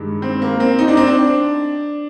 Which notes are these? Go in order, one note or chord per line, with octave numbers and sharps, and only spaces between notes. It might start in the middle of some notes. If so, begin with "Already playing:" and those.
Already playing: G2 D#3 G#3
C4
A#3
C4
D#4
D4
C4
D4